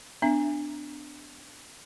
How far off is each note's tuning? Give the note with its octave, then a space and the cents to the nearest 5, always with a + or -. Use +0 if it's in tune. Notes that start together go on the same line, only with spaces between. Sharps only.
B3 +40 D4 +10 E5 +20